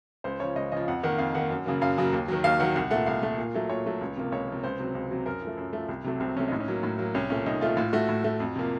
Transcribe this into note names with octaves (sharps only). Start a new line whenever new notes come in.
C#2 C5
C#3 F3 C#5
C#2 D#5
C#3 F3 D#5
F2 F#5
D#3 A#3 F#5
F2 F5
D#3 A#3 F#5
F#2
C#3 F#3 A#3
F#2 F5
C#3 F#3 A#3
D#2
D#3 F#3
D#2 F5
D#3 F#3 F#5
C2 F#5
A#2 A3 F#5
C2 F5
A#2 A3
A#2
F#3 A3
A#2 C#5
F#3 A3
C#2
C3 F3 A#3
C#2 C#5
C3 F3 A#3
C#2 C5
C3 F#3
C#2
C3 F#3
F#2 A#4
F3 A3
F#2
F3 A3
C2
C3 F#3 A3
C2 C4
C3 F#3 A3 C#4
A2 D#4
C#4
F#3 A#3
A2
F#3 A#3
C2 C#4
A#2 A3 C#4
C2 D#4
A#2 A3 F4
A2 F4
A3 F#4
A2
A3
F2
C3 F3 A#3